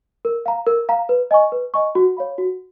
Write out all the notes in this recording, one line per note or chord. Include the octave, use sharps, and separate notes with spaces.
A#4
F5 A#5
A#4
F5 A#5
B4
D#5 G#5 C#6
B4
D#5 G#5 C#6
F#4
C#5 F5 B5
F#4